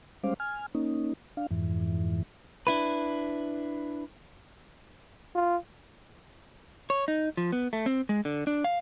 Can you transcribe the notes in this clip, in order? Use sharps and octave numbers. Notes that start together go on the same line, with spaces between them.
G3 G#3 C#4 C5 F5 D6
G#5 F6
A#3 C#4 D#4
D4 F5
F2 G#2 E3
D4 E4 B4
F4
C#5
D#4
F3
B3
A3
C4
G#3
D3
D4
F5